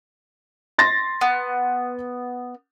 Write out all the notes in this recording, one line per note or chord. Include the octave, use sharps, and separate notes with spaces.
C6 A6 A#6
B3